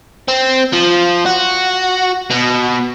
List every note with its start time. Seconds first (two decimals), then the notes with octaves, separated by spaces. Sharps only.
0.28 C4
0.73 F3
1.26 F#4
2.30 B2